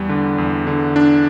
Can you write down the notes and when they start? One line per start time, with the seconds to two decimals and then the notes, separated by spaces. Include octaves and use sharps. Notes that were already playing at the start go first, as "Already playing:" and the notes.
Already playing: E2 G3
0.09 D3
0.38 E2
0.67 D3
0.96 D4